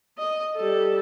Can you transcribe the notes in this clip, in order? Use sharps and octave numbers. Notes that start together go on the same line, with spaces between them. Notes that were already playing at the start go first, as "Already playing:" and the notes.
D#5
G3 A4